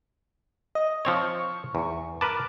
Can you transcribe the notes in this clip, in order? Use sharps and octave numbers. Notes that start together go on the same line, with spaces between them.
D#5
F3 C4 C#5 C#6
E2
A#4 B4 A5 D6